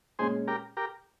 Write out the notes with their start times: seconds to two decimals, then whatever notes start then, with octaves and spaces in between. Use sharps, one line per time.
0.19 A#2 G#3 C#4 G#4 C5
0.47 G4 A#4
0.77 G4 A#4